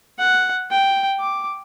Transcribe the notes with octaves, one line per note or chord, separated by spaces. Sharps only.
F#5
G5
D6